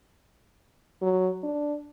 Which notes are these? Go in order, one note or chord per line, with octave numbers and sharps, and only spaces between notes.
F#3
D4